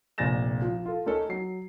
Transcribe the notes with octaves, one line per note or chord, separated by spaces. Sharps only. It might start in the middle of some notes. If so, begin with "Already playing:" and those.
F1 A#1 G#5 A6 A#6 E7
F3
F4 A4
A3 C#4 D#4 A4 A#4
F#3 C7